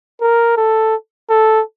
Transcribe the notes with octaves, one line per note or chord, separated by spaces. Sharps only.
A#4
A4
A4